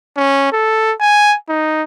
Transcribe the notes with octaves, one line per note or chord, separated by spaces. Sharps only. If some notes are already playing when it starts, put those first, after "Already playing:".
C#4
A4
G#5
D#4